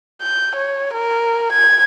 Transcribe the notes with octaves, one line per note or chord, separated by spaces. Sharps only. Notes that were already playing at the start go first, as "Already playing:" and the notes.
G6
C#5
A#4
G#6